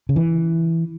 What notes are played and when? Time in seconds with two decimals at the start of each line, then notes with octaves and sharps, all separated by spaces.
0.09 C#3
0.16 E3